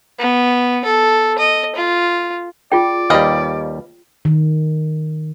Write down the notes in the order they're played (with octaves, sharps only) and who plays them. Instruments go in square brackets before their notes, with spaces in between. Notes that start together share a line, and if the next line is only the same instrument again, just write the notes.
[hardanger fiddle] B3
A4
D#5
F4
[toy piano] F4 G#4 G5 [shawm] D5
[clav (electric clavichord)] D#2 G3 [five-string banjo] B4 D#5 F5
[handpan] D#3